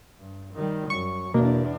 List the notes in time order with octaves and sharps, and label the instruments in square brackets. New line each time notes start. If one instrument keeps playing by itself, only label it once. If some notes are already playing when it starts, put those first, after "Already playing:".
[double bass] G2
D#3 G3
[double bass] F#2 [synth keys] C#6
[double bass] E2 D4 [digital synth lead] B2 [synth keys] A#3